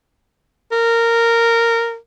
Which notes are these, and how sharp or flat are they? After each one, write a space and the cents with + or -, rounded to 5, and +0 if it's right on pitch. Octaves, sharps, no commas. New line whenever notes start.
A#4 -15